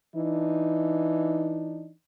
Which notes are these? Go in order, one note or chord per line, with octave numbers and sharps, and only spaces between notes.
E3 D4 D#4